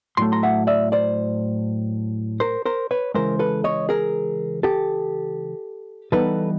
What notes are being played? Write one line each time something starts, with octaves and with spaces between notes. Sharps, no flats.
A2 F#3 A3 C6
A#5 C6
E5 F#5
D5 E5
C5 D5
A#4 C5
A#4 C5
B4 C#5
C#3 E3 G#3 A#4 C5
A4 B4
C#5 D#5
G#4 A#4
G4 A4
E3 G3 B3 D#4 A4 B4